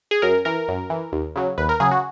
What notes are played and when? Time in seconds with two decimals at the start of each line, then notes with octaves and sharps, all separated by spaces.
0.11 G#4
0.22 F#2 A#4
0.45 E3 A#4
0.68 F#2
0.90 E3
1.12 D#2
1.36 C#3 F#3
1.58 D#2 B4
1.69 A#4
1.80 C#3 F#3 G#4
1.91 F#4